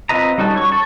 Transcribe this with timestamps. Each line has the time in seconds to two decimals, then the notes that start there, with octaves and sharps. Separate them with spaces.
0.09 C4 F4 B4 D#5 A#5
0.38 G3 C#4 D#4 F#4 A4
0.56 C#5 C#6
0.72 F#4 A5 C#6